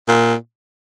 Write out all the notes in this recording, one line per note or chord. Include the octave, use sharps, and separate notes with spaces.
A#2